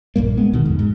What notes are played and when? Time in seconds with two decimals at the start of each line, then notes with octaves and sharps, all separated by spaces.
0.16 A#1 G2 G3 A#3
0.37 G#3 B3
0.53 D2 B2 D3 D#3
0.65 F2 G#2
0.79 G#2